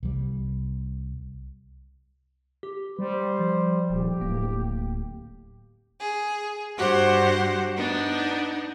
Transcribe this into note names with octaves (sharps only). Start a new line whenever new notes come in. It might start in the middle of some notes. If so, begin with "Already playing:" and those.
C2 G3
G4
G3 C5
F3
D#1 G4
D1 A#3
G#4
G2 F#4 G4 C5 F#5
B3 D4 D#4